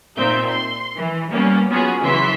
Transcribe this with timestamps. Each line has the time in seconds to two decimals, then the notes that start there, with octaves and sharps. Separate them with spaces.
0.17 A#2 C4 D#4 E5 G6
0.48 C6
0.96 E3
1.30 G3 A#3 B3 C#4
1.69 F#3 B3 C#4 F4 F#4 G#4
2.01 C#3 E3 F#3 E5 C6 B6